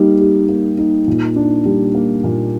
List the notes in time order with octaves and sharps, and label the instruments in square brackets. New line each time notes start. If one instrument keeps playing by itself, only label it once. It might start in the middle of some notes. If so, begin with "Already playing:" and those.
Already playing: [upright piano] G3 A#3 D#4
G4
A#3
D#4
A#2
D4
G3
A#3
A#2